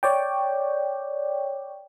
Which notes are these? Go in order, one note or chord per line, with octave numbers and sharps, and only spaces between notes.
C#5 D5 G5